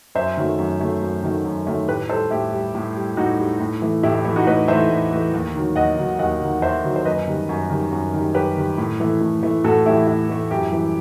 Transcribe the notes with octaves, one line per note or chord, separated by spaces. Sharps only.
F#2 C5 E5
D#3 F#3 A3
F#2
D#3 F#3 A3
F#2
D#3 F#3 A3
F#2
D#3 F#3 A3
A2 G4 B4
G3 A4 C5
A2 E4 G4
G3
A2
G3
A2 D#4 F#4
G3
A2
E3 A3
A2 E4 G4
E4 G4
E3 A3
D#4 F#4
A2 B4 D#5
E3 A3 C5 E5
A2
E3 A3
D#2
D#3 F#3
D#2 D#5 F#5
D#3 F#3
D#2 D#5 F#5
D#3 F#3
D#2 C5 E5
D#3 F#3
C5
F#2 B4 D#5
D#3 G3
F#2
D#3 G3
F#2
D#3 G3
F#2 G4 B4
D#3 G3
A2
E3 A3
A2
E3 A3
A2 F#4 A4
E3 A3 E4 G4
A2 E4
E3 A3
F#2 E4 G4
E3 G3